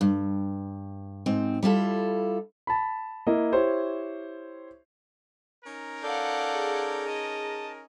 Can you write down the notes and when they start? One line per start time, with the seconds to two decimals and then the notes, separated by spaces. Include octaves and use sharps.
0.01 G2
1.26 G#2 C4
1.63 G3 E4 F4 A4
2.67 A5 B5
3.27 A#3 E4 D#5
3.52 E4 G4 C5 C#5
5.65 C#4 D#4 A#4
6.03 A4 D5 F5 F#5 G6
6.54 G#4
7.06 D#5 A5